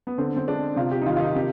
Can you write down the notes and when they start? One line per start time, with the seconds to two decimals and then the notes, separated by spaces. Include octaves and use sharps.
0.07 B3
0.18 D3 C4
0.37 C4
0.47 G#3 D4
0.76 C3 F4
0.91 G4
1.02 D#4
1.06 D#3 F4
1.16 F4
1.20 D#4
1.35 C3 G4